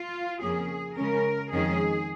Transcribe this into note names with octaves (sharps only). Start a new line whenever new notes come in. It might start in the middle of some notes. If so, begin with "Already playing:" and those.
Already playing: F4
F2 C#3 A#3 C#4 G#4
C#3 G#3 C#4 A#4
F2 D#3 G#3 C#4 G#4